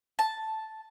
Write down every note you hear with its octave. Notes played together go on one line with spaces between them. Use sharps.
A5